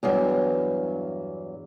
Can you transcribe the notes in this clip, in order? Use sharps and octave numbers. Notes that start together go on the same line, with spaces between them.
E2 G2 F#3